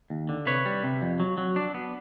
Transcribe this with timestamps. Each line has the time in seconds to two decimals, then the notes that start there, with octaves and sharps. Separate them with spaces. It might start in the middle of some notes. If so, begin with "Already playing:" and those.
0.10 D#2
0.29 D3
0.46 C3 B4 C#5
0.65 G3
0.84 C3
1.02 F2
1.20 F#3
1.38 F#3
1.56 D4
1.74 B3